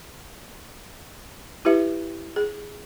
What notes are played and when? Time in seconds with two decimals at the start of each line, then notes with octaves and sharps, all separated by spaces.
1.65 E4 G4 B4 E5
2.36 G#4